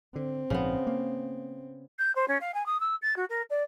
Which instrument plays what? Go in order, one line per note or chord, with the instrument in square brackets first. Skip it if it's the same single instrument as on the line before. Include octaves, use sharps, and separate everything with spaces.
[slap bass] D3 [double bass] C4
[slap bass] A#1 G#2 F3 [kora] C#3 B3
[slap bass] A#3
[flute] G6
C5
C#4
F5
G#5
D#6
E6
A6
F#4
A#4
D5